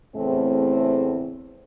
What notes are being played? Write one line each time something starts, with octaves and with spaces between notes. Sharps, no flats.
E2 A2 C#3 A3 C4